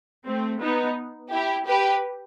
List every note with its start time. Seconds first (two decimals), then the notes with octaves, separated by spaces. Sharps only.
0.26 A3 C4
0.61 B3 D#4
1.32 E4 G4
1.67 G4 B4